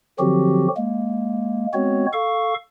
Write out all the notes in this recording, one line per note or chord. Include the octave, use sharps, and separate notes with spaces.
D3 F3 F#3 C4 F#4 G4
G#3 A#3
G#3 B3 C4 F#4 C#5
A4 F5 C#6